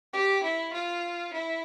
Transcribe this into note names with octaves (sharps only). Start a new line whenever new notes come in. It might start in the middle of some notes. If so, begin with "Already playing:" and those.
G4
E4
F4
E4